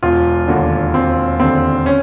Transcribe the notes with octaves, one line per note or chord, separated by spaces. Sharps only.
E1 F4
D#2 D3 F#4
E1 C4
D#2 D3 C4
C#4